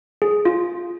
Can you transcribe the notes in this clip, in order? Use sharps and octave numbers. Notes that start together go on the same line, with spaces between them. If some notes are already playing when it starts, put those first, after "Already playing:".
G#4
F4